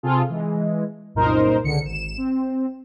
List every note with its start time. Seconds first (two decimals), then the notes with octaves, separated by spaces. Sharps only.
0.03 C3 C4 F4 G#4 A4
0.29 E3 G#3
1.15 C2 F#2 A#2 D#4 A#4 C5
1.64 C#2 D3 C#7
1.85 G#1 E7
2.17 C4